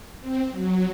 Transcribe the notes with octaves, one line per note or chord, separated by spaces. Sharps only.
C4
F#3